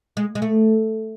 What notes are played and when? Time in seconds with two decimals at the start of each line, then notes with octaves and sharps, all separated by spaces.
0.17 G#3
0.35 G#3
0.42 A3